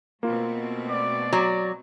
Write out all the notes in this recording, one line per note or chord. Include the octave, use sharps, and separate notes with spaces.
B2 A3 A#3 C4 F4
D5
F#3 A#5